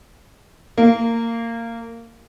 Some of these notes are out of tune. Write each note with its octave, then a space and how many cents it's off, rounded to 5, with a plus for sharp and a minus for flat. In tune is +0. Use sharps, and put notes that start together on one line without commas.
A#3 -20